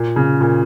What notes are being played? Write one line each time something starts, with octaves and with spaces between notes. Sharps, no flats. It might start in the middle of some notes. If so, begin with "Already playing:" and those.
Already playing: A#2
C#3
A#2